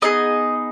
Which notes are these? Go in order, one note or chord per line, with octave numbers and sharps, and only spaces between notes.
B3 D#4 G#4 D#5